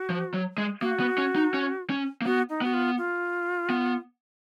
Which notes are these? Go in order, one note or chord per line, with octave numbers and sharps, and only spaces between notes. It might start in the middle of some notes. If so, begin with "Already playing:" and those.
Already playing: F#4
F3
F#3
G#3
A#3 F#4
B3
C#4
D#4
C#4
C#4
A#3
B3 F#4
D#4
B3 F#4
F4
F4
B3